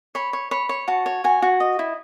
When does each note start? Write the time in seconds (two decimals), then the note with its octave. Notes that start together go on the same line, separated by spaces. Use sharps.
0.15 C#5 B5
0.33 C#5
0.51 C#5 B5
0.69 C#5
0.88 F#4 A5
1.06 C#5
1.24 F#4 G#5
1.42 F#4
1.60 D#5
1.79 E4